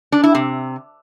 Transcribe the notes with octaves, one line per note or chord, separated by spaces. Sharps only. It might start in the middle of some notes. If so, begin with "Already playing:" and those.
D4
E4
C3